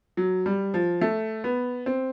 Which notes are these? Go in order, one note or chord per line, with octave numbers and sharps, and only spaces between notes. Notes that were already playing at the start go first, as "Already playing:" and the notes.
F#3
G3
F3
A3
B3
C4